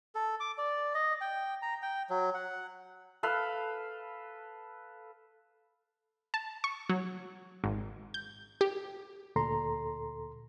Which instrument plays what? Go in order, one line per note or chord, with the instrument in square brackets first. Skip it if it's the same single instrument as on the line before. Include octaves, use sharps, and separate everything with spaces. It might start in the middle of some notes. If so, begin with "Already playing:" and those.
[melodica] A4
D6
D5
D#5
G5
A#5
G5
F#3
F#5
[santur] A4 B4 F5
[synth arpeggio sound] A5
C#6
F#3
G#1
G6
G4
[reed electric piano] D2 A#2 A4 A#5 C6